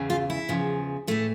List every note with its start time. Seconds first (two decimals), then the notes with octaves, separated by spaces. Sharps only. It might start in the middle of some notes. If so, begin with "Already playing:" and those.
Already playing: E2 C#3 E3
0.10 F4
0.30 E4
0.49 E2 C#3 F3
1.07 A2 E3 A3